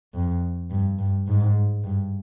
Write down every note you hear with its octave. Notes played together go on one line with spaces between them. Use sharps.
F2
G2
G2
G#2
G2